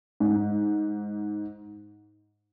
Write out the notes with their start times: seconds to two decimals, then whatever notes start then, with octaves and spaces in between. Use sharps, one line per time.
0.20 G#2